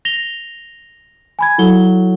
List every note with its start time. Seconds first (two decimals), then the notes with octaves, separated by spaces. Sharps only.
0.05 A#6 F7 G7
1.39 G#5 B5 G#6
1.58 F#3 E4 A4 G7